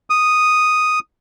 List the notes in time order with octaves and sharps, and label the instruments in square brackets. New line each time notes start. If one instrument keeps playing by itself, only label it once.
[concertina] D#6